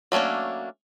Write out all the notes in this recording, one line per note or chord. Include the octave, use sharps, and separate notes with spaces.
F#3 A3 A#3 C#4 D4